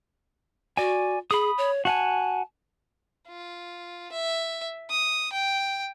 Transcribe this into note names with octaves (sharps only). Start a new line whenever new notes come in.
F#4 D5 G#5
G#4 B5 D#6
C#5
F#4 F#5 G#5 A5
F4
E5
D#6
G5